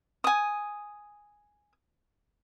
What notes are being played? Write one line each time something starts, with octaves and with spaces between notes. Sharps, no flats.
G#5 D#6